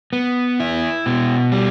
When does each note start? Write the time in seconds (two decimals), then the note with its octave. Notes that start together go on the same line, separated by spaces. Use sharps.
0.13 B3
0.60 E4
1.06 B2
1.52 G3